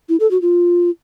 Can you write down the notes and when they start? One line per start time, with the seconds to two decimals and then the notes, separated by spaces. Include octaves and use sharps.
0.09 E4
0.20 A4
0.31 F#4
0.42 F4